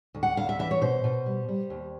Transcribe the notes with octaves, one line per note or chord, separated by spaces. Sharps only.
D2
F#5
D2 F5
E5
E3 E5
C#5
B2 C5
B2
G3
G3
D#2